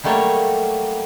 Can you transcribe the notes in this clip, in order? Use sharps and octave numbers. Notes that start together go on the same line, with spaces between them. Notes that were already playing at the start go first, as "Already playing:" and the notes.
F#3 G3 A3 A#3 A4 C#5